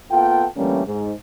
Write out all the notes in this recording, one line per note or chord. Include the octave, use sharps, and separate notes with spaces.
A#3 B3 F4 A4 F#5 G5
D3 E3 G3 A3 A#3 C#4
G#2